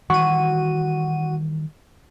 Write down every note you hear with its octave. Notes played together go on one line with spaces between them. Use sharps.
D#3 E3 G3 F#4 D#7